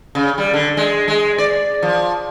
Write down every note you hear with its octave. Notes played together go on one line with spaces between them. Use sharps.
C#3
G3
D3
G#3
G#3
D5
F3